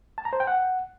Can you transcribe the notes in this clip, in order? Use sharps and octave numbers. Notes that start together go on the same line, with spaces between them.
A5
A#5
C5
G5
F#5